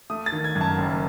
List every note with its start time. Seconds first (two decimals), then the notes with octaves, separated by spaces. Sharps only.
0.10 A3 D#6
0.26 A6
0.32 D#3
0.44 G#6
0.56 F#2
0.61 A5
0.78 F#1